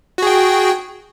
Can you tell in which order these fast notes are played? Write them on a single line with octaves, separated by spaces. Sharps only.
F#4 G#4 G5